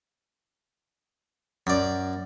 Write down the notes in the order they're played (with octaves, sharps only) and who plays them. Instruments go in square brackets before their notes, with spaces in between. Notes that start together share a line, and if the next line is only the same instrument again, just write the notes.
[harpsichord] F#2 D5